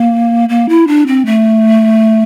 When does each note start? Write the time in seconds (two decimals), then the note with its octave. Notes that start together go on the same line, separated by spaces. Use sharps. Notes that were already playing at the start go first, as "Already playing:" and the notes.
Already playing: A#3
0.49 A#3
0.69 E4
0.87 D4
1.07 C4
1.26 A3